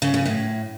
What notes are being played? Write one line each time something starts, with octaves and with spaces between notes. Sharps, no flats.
C#3
C#3
A2